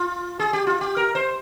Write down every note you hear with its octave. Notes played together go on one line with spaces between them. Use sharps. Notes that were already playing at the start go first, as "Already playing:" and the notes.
Already playing: F4
G#4
G4
F4
G4
A#4
C5